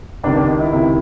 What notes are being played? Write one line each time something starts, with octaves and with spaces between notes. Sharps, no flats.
C#2 C3 D#3 D4
D4
D#4
E4
C#2 C3 D#3 E4